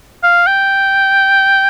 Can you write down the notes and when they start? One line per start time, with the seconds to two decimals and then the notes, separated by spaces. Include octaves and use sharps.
0.23 F5
0.47 G5